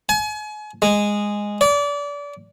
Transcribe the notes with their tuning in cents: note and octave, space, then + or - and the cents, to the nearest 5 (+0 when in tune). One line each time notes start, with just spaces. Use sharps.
G#5 +35
G#3 -10
D5 -30